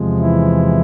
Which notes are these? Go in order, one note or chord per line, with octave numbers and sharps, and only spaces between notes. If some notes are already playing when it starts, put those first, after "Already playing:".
Already playing: E2 C3 F3 G#3
E3 E4